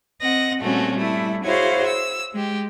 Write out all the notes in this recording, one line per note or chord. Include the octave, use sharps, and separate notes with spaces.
C4 D#5 F#5 A#6
A#2 G3 A3 C4 C#4 F#4
G3 A3 E4
E4 F#4 G#4 C5 C#5 F5
E6
G#3 G4